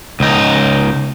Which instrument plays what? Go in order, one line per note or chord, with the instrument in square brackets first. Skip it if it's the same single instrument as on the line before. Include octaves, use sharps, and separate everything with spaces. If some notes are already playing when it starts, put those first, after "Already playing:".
[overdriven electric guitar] C#2 D#4